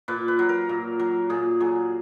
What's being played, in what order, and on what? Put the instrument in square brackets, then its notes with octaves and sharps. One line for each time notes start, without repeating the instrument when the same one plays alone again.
[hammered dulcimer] A#2 B4
B4
F#3
A#4
A#2
F#3
A#2 G#4
F#3 G#4